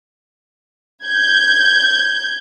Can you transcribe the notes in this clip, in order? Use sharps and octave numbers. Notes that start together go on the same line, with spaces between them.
G6 G#6